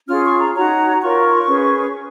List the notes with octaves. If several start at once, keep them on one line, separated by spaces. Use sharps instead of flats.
C#4 F4 G#4 F6
C#6
A#5
D#4 F#4 C#5 A#5
F4 A#4 C#5 C#6
C#4 G#4 B4